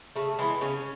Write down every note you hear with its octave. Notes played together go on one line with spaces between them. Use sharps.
C#3 A3
E3 G#3 B3
C#3 C#4